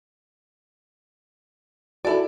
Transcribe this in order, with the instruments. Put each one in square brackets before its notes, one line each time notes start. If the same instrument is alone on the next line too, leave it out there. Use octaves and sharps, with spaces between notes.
[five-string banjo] E4 D5 [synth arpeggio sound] F#4 G#4 A4